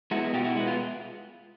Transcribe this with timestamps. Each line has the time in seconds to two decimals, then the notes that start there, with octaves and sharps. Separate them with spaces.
0.11 G#3 B3 E4 F#4
0.33 B2 F4 G4
0.44 E4 F#4
0.56 G#3 E4
0.60 B3
0.67 F4